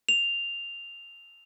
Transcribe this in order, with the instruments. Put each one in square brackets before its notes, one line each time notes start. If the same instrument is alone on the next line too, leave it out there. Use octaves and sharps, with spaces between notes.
[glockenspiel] F7